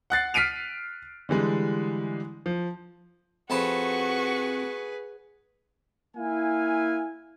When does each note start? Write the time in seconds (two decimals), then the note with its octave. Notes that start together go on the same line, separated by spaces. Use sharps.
0.10 F#5 F#6 A6 C7
0.34 F6 B6 C7 D7 D#7 F7
1.29 D3 E3 G3 G#3
2.46 F3
3.50 F2 F#4 G#4 B4 A5 B5 C#6
6.15 A#3 E4 F5 G#5